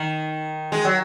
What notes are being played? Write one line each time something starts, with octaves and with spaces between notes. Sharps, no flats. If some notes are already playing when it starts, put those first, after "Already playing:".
Already playing: D#3
G#3
F#3